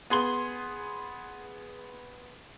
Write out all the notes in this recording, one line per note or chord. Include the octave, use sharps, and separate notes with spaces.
B3 G#4 C6 G7